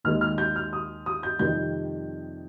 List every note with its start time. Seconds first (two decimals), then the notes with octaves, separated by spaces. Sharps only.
0.04 D#2 D#3 G#3 F6
0.21 F6
0.38 G6
0.56 F6
0.73 D#6
1.06 D#6
1.23 G6
1.39 F2 C3 D#3 G3 G6